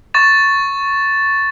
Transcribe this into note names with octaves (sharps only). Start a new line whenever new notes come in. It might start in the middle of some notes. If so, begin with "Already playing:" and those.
C#6 A6 E7